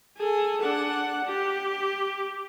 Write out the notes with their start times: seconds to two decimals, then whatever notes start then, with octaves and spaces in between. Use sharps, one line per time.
0.18 G#4 A4
0.61 D4 F#5
1.24 G4